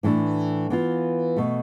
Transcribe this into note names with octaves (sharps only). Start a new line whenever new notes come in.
A2 E3 A3 D4
E3 B3 F4
B2 A3